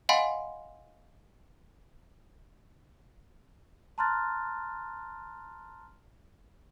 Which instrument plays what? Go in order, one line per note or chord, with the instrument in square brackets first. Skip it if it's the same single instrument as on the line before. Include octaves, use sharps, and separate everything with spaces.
[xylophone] D#5 F5 F#5 G#5 B5 C6
[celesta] A5 A#5 C6 F6 F#6 A6